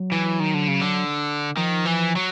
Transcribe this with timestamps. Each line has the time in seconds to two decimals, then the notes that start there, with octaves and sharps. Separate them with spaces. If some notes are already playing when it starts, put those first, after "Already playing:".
Already playing: F#3
0.12 E3
0.40 D#3
0.54 D3
0.68 C#3
0.82 D3
1.57 D#3 F3
1.86 E3
2.16 F#3